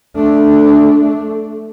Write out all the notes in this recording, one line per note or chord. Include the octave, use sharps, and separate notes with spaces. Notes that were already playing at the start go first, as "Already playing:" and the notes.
A3 D4